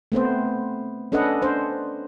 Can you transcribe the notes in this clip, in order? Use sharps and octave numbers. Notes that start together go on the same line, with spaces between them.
A3 B3 C4 C5
C#4 D4 A4 B4 D#5 F#5
D4 C5